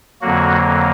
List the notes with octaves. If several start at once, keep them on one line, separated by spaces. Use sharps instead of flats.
F2 D3 F#3 A#3 F#4